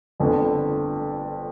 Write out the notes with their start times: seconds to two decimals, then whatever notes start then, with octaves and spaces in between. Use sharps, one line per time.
0.20 G1 F2 D3